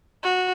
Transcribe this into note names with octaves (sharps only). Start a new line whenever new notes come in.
F#4